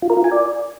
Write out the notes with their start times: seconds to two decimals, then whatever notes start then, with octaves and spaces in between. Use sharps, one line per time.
0.02 F4
0.10 A#4
0.17 F4
0.24 G#5
0.32 D5